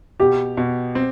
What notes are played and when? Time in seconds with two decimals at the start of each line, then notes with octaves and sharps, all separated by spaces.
0.20 B2 G4
0.57 B2
0.95 C4